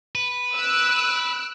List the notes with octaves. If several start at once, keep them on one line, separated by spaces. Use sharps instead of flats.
B4
E6 F#6 D7